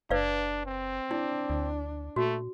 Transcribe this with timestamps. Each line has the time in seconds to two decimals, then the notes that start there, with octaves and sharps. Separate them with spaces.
0.10 F#1 D4 B4 D5 F5
0.66 C4
1.11 D4 E4
1.50 D2
2.16 A#2 A3 F#4